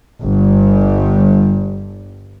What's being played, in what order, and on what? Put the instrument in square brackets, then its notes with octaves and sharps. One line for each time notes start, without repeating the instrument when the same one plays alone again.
[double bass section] G1 G2